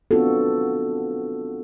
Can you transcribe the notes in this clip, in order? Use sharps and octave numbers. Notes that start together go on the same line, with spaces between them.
B3 C4 D4 F4 F#4 A4